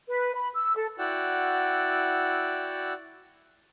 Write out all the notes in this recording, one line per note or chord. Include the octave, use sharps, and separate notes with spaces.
B4
B5
E6
A4
E4 F#4 D5 F#5 G5 E6